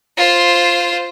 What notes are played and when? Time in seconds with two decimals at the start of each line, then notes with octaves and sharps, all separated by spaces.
0.17 F4 C5